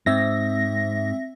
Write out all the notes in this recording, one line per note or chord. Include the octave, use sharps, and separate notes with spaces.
G#2 C4 E5 A#6